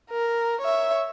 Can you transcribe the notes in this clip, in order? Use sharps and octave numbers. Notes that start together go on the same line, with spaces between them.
A#4
C#5 E5